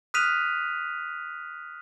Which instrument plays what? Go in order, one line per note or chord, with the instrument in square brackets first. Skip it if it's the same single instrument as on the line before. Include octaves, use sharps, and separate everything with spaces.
[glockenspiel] D#6 F6 F#6 B6 D#7 F7